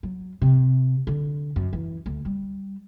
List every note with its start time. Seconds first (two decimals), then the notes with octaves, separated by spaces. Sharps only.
0.03 F#3
0.42 C3
1.07 D3
1.56 F#2
1.73 E3
2.06 D2
2.25 G3